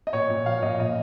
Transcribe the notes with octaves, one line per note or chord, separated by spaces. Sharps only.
D#5
A#2 C#5
A#2
F3 F5
A#2 D#5
A#2 D#5